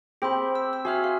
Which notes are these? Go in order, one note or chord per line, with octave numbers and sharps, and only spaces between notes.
C4 G4 G#4 B5
E6
E6
F#4 G#4 E5 F6
F5